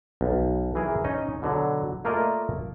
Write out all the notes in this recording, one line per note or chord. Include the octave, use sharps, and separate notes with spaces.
B1
E3 G#4 A#4
C#4 D#4 D#5
B2 D3 F#3
A3 A#3 F4 A#4 D5 D#5